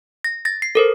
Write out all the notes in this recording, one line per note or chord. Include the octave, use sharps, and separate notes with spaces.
A#6
A6 A#6
C7
A4 A#4 C5